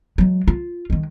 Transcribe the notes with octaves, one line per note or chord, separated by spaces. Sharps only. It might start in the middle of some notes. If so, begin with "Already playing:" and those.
F#3 G#3
F4
D#3 G#3